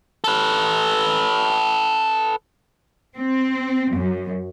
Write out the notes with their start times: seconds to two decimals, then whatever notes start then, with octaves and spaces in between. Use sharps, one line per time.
0.24 A4 B4
3.16 C4
3.93 F#2